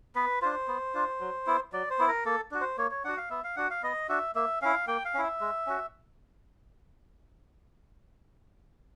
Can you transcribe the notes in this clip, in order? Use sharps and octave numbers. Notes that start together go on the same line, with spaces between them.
B3 B4
D4 F4 C5
B3
D4 F4
F#3
B3 E4
F#3 D5
C5
B3 E4
A#4
A#3 A4
D4 F#4
C5
A#3 C#5
C#5
D4 F#4 F#5
F5
B3 E5
F5
D4 F#4 F#5
F5
B3 D#5
D4 F#4 E5
A#3 E5
C#4 E4 F5
A#3 G5
F5
C#4 E4
E5
G#3
C#4 F#4